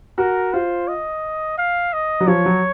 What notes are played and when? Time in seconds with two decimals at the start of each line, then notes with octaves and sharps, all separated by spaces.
0.18 F#4 A#4
0.53 F4 C5
0.88 D#5
1.58 F5
1.93 D#5
2.20 F#3
2.28 F3 C#5
2.46 F#3